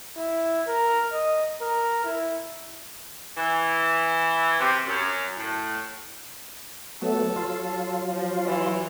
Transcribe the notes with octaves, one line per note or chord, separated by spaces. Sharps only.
E4
A#4
D#5
A#4
E4
E3
C3
F#2
A2
F#3 A3 B3 A4
F#3 F4
F3
E3